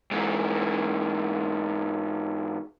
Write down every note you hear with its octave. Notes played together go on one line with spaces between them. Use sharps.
G#2 E3